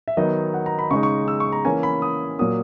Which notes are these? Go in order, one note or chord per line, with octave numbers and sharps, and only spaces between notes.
E5
D#3 F#3 B3 D#4 D#5
F#5
A#5
B5
C#3 G#3 D#4 C#6
C#6
E6
C#6
A#5
E3 A#3 C#4 G#5
B5
D#6
A#2 F#3 A#3 D#6